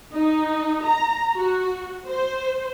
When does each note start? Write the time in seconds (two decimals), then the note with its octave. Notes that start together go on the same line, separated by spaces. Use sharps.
0.13 D#4
0.84 A#5
1.36 F#4
2.07 C5